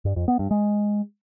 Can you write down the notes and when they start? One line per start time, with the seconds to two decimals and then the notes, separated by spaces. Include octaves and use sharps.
0.05 G2
0.16 F2
0.28 B3
0.39 G2
0.51 G#3